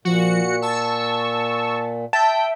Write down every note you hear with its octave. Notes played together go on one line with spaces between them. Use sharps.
A#2 F3 F#4 C#7
A5 C#6 E6
E5 G5 A5